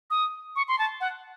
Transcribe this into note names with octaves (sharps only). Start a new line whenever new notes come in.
D#6
C#6
C6
A5
F#5